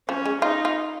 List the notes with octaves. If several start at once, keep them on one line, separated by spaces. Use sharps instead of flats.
F3 C#4
G#3
D#4 F4
F4